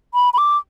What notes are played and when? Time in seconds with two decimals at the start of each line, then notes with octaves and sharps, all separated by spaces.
0.14 B5
0.33 B5
0.38 D6